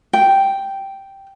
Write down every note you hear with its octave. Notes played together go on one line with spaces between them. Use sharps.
G5